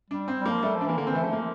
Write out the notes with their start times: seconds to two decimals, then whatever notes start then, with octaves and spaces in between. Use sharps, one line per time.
0.10 G3 D4
0.28 C4
0.40 G3
0.45 A#3
0.51 F3
0.63 G3 A3
0.75 F3
0.81 D4
0.86 E3 A#3
0.97 D3 A#3
1.07 C4
1.10 E3 A3
1.22 F3 A3
1.33 A#3